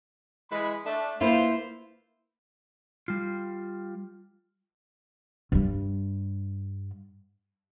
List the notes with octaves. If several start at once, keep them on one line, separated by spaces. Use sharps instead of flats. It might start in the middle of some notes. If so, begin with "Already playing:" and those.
E3 G#3 B5
A3 D4
A#3 E4 F4 B4 C5
G3 F4
G2 G3